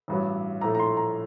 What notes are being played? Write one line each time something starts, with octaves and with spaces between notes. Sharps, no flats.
A1 G2 F#3
A#1 A2 A3 A#5
A#5
C6
A#5